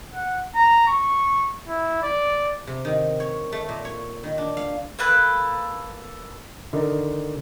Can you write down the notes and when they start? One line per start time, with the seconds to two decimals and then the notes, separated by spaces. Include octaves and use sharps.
0.14 F#5
0.55 A#5
0.87 C#6
1.68 E4
2.03 D5
2.67 C3
2.85 D#3
3.20 C#5
3.52 A3
3.69 A#2
3.85 C#5
4.24 D#3
4.38 D4
4.57 F5
4.99 A#3 A4 B4 F#6
6.73 D3 D#3 D#4